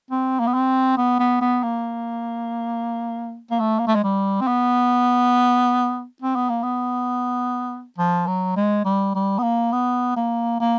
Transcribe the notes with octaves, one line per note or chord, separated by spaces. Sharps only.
C4
A#3
B3
C4
B3
B3
B3
A#3
A#3
A3
A#3
A3
G#3
G3
C4
B3
C4
B3
A#3
B3
F3
F#3
G#3
G3
G3
B3
A#3
B3
A#3
A#3